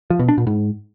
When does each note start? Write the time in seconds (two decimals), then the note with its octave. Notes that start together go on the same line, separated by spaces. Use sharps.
0.10 F3
0.19 B2
0.29 D4
0.38 A#2
0.47 G#2